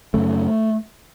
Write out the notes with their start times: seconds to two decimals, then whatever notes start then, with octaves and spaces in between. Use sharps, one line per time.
0.14 F#2 C#3 A3